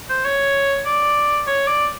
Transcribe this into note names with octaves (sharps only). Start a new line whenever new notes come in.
C5
C#5
D5
C#5
D5